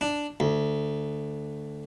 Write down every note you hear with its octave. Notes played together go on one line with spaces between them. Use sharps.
D4
D2